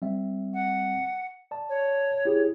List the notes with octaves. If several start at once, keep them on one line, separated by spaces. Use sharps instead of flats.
G3 C4 E5
F#5
D5 A5
C#5
E4 G4 G#4